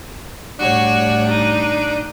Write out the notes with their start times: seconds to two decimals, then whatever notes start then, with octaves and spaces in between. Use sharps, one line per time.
0.59 A2 G3 D4 F#4 C#5
1.29 D#4